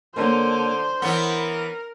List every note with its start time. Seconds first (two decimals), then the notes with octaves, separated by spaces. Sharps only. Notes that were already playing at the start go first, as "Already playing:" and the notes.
0.16 D3 A#3 C#4 A#4 C5
1.02 E3 B3 C#4 A#4